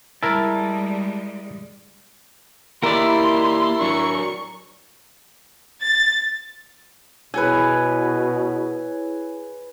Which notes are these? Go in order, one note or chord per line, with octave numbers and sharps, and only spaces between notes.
G3 G#3 E4 A#4 A5
A#3 E4 G4 A#4 D5 C6
F#3 D4 C#6
A6
B2 E4 G#4 B4 C#5 G#5